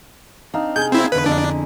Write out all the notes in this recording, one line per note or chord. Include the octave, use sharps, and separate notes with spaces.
C4 D4 D#4 F5
C3 G#4 G6
C4 E4
E2 D3 B4
F2 D3 D4 E4